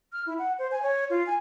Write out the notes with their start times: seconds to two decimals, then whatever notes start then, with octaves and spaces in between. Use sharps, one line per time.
0.12 F6
0.26 E4
0.39 F#5
0.59 C5
0.71 G#5
0.83 C#5
1.10 F4
1.26 G#5